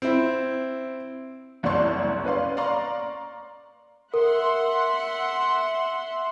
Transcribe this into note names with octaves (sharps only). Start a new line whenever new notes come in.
C4 E4
F#1 C2 D4 D5 C6 C#6
C#4 B4 D5 F5 C6
D5 F5 A#5 C6 C#6
A#4 E5 F#5 C6